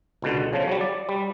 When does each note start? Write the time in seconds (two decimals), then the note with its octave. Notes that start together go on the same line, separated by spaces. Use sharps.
0.22 C#2 B2 D3
0.53 C#3 F3
0.68 F#3 G3
0.81 D5
1.09 G3